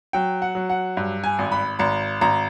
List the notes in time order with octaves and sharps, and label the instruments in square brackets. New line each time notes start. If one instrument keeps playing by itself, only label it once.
[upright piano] F#3 G5
F#5
F#3
F#5
G2
G#5
G#1
B5
G#1 A#5
G#1 A#5